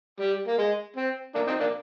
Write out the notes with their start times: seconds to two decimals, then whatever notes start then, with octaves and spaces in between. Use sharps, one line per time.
0.20 G3
0.48 A#3
0.58 G#3
0.96 C4
1.34 A#3 D4
1.47 C4 D#4
1.60 A#3 D4